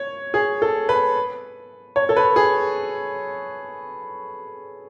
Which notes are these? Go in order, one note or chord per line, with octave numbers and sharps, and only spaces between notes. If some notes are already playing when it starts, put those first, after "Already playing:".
Already playing: C#5
G#4
A4
B4
C#5
A4
B4
G#4